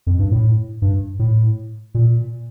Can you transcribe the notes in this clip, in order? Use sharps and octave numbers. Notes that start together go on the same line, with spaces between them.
F2
G2
A2
G2
A2
A#2